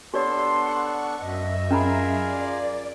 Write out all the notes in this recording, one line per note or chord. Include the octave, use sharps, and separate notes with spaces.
B3 D4 G4 A4 C#5 D5 C6
F#5 C#6
F#2 D#5 E5
C#4 F4 G#4 A#4 A#5 B5
D5